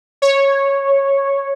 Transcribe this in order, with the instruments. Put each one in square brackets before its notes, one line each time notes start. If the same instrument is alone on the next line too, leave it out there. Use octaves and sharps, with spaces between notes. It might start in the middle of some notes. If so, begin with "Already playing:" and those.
[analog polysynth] C#5